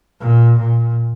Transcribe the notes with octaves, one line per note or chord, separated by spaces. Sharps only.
A#2
A#2